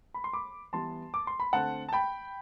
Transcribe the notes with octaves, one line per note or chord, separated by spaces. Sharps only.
B5
C6
B5 D6
E3 G3 B3 A5 C6
D6
C6
B5
D3 A3 C4 F#5 A5
A5
G5 B5